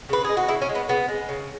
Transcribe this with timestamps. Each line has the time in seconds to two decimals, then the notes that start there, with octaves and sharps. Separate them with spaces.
0.09 C#3 B4
0.25 G#3 G#4
0.37 F#4
0.48 C#3 E4
0.62 C#4
0.69 G#3
0.75 B3
0.88 C#3 B3
1.08 G#3
1.29 C#3